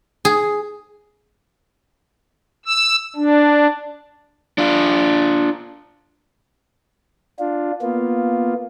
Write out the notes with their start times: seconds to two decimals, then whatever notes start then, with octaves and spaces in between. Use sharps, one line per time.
0.25 G#4
2.66 E6
3.16 D4
4.58 D4 F4
7.39 D4 F4
7.82 A#3 B3 F4